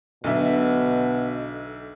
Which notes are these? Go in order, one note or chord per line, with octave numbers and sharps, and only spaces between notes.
B1 B2 D3 E5